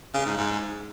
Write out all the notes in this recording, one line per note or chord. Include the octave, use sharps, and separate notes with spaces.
C#3
G#2
G#2